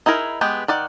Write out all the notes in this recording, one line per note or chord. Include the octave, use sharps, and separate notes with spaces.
D#4 E4 G#4 A#4
G#3 B3 G4
D#3 D5 F#5